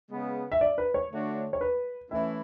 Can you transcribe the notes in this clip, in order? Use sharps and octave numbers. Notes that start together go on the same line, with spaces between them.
C#3 G#3 B3
E5
D5
B4
C#5
D3 A3 D4 F#4
C#5
B4
E3 A3 C#4 E4 E5